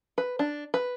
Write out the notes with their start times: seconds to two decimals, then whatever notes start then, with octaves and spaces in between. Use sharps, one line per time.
0.18 B4
0.39 D4
0.74 B4